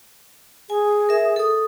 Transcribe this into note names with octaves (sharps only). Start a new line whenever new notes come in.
G#4 G#5
A#4 E5
A4 D#6